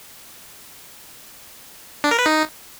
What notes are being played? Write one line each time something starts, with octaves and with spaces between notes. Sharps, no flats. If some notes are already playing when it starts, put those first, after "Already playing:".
D4
A#4
B4
D#4